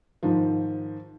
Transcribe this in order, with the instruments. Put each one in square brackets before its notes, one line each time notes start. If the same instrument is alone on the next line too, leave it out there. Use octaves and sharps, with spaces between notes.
[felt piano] G#2 D#3 F3